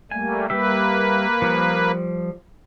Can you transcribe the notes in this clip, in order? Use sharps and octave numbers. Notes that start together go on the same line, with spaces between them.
G3 A3 A#3 G#5
G3 A#3 G4 B4 E5
F3 G3